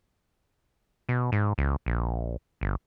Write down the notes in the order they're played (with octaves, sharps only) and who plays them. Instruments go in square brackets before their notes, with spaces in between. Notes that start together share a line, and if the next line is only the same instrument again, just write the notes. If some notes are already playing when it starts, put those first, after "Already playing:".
[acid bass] B2
G#2
C#2
A#1
G1